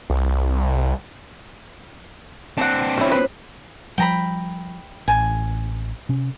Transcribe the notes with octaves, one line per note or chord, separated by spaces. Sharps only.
C2
C4 D4 F#5 A5
F3 A3 C#4 E4 F#4
B4
F3 G3 G5 A#5 B5
A1 G#5
C3 C#4